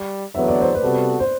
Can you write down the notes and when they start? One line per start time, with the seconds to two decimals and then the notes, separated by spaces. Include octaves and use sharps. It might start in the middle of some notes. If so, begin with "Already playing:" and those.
Already playing: G3
0.35 E2 D3 F#3 B3 E5
0.48 D5
0.61 C5
0.75 B4 D5
0.82 C3 G3 B3 F#4 A4
1.20 C5